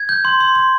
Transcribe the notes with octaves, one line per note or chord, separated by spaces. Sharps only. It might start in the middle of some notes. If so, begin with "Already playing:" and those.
Already playing: G#6
G6
C6
C6
C6